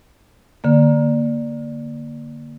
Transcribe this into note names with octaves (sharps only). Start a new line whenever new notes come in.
D3 A#3